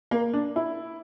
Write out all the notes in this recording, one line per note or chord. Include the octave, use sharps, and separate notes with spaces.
A#3
D4
E4